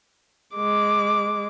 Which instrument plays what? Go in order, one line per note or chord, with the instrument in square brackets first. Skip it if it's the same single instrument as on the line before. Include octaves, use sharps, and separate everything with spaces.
[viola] G#3 D6